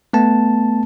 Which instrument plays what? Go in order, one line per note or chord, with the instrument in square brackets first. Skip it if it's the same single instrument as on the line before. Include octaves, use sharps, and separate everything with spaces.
[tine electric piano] A3 B3 A5